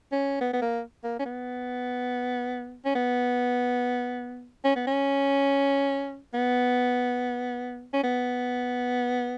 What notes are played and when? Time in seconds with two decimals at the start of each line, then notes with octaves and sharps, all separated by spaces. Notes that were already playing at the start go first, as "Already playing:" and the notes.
0.12 C#4
0.41 B3
0.53 B3
0.62 A#3
1.04 A#3
1.20 C#4
1.26 B3
2.85 C#4
2.95 B3
4.65 C#4
4.76 B3
4.87 C#4
6.34 B3
7.94 C#4
8.04 B3